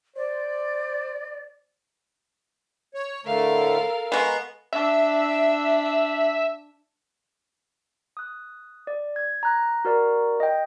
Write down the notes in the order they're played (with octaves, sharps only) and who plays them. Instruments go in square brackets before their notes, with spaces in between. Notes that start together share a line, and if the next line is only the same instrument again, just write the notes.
[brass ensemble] C5 [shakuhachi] D5
[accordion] C#5
[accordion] A2 D3 A3 [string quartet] A4 A#4 F5
[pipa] G#3 B3 [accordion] A#5 C6 C#6
[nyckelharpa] D4 [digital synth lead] E5
[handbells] D#6 F#6
D5
G#6
A#5 F#6 A#6
F#4 A#4 D5 A#5
D#5 G5